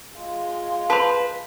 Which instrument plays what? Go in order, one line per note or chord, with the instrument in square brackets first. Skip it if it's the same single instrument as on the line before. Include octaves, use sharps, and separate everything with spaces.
[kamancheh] G#3 F4
[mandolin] B4 C5 [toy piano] A5 C6